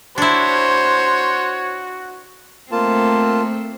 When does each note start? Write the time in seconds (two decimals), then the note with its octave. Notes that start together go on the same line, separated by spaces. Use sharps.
0.18 D4 E4 F#4 C5 C#5
2.72 A3 A#3 C4 F4 A5